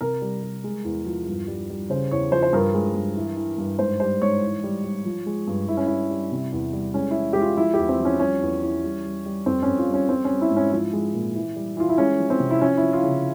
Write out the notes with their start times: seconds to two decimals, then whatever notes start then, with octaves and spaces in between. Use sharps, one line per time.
0.01 C3 A#4
0.22 G3
0.43 G3
0.64 G#3
0.85 E2
1.06 F3
1.27 G2
1.48 G3
1.70 G3
1.90 C#3 C5
2.11 E2 C#5
2.32 F3 C5
2.43 C5
2.53 G2 A#4
2.74 G#3
2.95 G2
3.17 E3
3.37 E3
3.58 G2
3.79 G#2 C5
4.00 G3 C5
4.22 G#2 C#5
4.42 E3
4.64 G3
4.84 G3
5.05 F3
5.26 G#3
5.47 G2
5.68 G2 E4
5.77 C#4
5.87 G3 E4
6.11 G3
6.32 C3
6.52 E2
6.73 G3
6.94 G#3 C#4
7.11 E3 E4
7.33 G#3 G4
7.41 F4
7.57 F3 E4
7.74 G4
7.79 E2
7.89 C4
8.00 F3
8.05 C#4
8.20 G3 C#4
8.42 E2
8.62 E3
8.84 G3
9.05 G3
9.26 G3
9.46 F2 C4
9.63 F2 C#4
9.78 F4
9.89 G3 C#4
10.09 G3 C4
10.25 C#4
10.31 G3
10.41 E4
10.51 G#2
10.57 C#4
10.72 F3 E4
10.93 G#3
11.14 A#2
11.35 E3
11.56 G3
11.77 E3 F4
11.89 E4
11.98 G#3 C#4
12.20 F3
12.30 C4
12.40 C3
12.51 E4
12.61 F3 C#4
12.77 F3 E4
12.93 F4
13.03 C#3